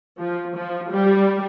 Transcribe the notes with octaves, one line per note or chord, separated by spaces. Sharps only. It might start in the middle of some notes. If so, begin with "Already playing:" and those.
F3
F3
G3